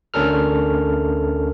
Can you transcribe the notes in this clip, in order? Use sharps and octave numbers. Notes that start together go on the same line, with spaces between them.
D2 C#4 D4 A4 A#4 F6